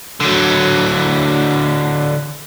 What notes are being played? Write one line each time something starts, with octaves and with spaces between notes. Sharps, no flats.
D3 F#3